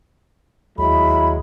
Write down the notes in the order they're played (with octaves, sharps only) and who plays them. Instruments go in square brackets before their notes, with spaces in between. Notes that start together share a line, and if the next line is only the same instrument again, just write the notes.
[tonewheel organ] D#2 [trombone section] F#3 G#3 E4 [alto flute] B5